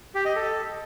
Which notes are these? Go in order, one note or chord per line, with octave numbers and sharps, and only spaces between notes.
G4
D#5
A4